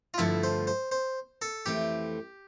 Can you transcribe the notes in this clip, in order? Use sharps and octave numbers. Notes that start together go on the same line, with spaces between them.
F4
G2 D3 F3 A3 E4
C5
C5
C5
A4
F2 E3 A3 C4 G4